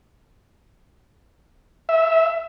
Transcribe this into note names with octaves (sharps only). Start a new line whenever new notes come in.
E5